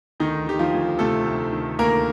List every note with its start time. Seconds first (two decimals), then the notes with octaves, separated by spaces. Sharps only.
0.20 D2 D#3 D#4
0.47 D#3 G4
0.59 F3 F4
0.73 D2
0.99 C3 A3 A4
1.26 D2
1.52 D#3
1.79 D2 A#3 A#4